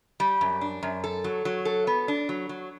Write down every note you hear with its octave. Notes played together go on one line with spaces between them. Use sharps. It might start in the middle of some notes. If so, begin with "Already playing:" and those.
G3
F#2
D4
F#2
A4
F#3
F#3
A4
B3
D4
F#3
F#3